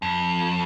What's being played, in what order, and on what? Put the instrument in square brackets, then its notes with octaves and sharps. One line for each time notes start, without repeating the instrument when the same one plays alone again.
[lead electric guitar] F2